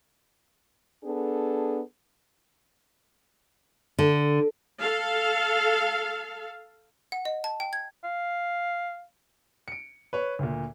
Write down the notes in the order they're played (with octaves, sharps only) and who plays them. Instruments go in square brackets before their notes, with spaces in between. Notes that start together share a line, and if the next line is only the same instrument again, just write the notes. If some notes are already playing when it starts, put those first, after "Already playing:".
[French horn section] B3 D4 G#4 A4
[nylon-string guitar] D3
[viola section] A4 F5
[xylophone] F#5
D#5
A5
G5
G#6
[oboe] F5
[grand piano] C#7 D7
B4 C#5
D2 A#2